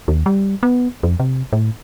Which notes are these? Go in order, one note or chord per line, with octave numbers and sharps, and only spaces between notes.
D#2
G3
B3
F2
C3
A2